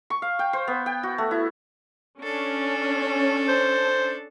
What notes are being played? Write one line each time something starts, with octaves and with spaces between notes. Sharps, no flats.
C#6
F5
G5
C5
B3
G5
F#4
A3
E4
C#4 D4 A4
C5